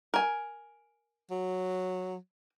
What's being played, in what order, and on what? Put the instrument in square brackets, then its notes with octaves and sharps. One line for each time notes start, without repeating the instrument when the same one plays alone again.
[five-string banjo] A#4 G#5
[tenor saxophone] F#3